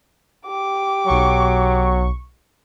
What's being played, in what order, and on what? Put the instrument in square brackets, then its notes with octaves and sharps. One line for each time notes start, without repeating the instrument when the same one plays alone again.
[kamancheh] G4 D6
[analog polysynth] B1 C#6 [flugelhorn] F#3